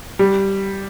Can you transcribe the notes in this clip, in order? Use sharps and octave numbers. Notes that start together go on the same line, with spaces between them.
G3